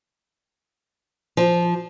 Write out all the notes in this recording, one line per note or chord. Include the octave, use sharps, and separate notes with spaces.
F3